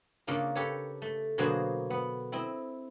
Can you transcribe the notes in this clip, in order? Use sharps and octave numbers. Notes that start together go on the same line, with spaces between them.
C#3 A#3 D4 D#4 F4
G4 A4 B4 C#5
A3
B2 D3 F#3 A#3 G#4 C5
B3
C4 E4 D#5